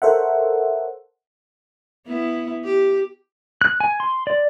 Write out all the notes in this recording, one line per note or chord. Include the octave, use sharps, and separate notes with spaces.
A4 A#4 C5 C#5 E5 F#5
B3 E4
G4
F#6
G#5
C6
D5